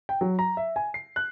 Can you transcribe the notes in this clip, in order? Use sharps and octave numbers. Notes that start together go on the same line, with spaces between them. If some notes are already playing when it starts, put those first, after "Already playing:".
G5
F#3
A#5
E5
G#5
C7
F#6